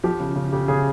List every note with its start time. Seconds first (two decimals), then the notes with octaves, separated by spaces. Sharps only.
0.03 F3 G4
0.20 C#3
0.36 C#3
0.53 C#3 G4
0.68 C#3 G#4